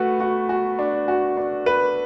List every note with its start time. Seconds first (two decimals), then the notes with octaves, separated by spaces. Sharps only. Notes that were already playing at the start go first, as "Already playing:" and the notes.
Already playing: A3 F#4 B4
0.20 F#4
0.49 F#4
0.79 D4
1.08 F#4
1.37 D4
1.66 B4